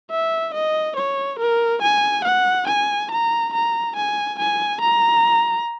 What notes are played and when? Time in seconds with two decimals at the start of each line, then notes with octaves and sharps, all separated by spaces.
0.11 E5
0.54 D#5
0.97 C#5
1.40 A#4
1.82 G#5
2.24 F#5
2.68 G#5
3.11 A#5
3.53 A#5
3.96 G#5
4.39 G#5
4.82 A#5